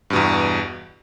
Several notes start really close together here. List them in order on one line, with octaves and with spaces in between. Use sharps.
G2 B2 E2